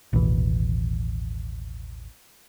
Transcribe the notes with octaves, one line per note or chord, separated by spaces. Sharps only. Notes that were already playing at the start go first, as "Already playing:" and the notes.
A1 D#2 B2 E3